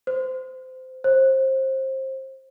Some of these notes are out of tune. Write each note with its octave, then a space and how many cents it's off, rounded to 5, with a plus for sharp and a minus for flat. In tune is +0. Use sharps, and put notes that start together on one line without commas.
C5 -20
C5 +25